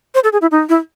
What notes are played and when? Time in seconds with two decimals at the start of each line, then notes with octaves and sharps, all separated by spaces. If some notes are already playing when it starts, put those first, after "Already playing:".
0.15 C5
0.24 A4
0.33 G#4
0.42 E4
0.51 D#4
0.69 E4